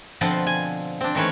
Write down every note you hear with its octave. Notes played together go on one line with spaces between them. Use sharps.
B2 D3 F3 C4 F4 B4
G#5
C4 D4
D#3 E3 A3 C#4 B4 C#5